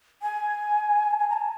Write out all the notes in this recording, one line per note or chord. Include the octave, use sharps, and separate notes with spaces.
G#5
A5
G#5
A#5
A5